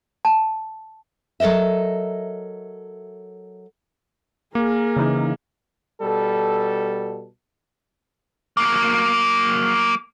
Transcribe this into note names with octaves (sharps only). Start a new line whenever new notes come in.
A5
F#3 A4 A#4 D#5 E5
A#3 G#4 A#4
C#3 E3 D#4
B2 G3 A4
F#3 A#3